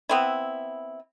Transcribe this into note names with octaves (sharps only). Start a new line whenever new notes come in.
B3 C4 E4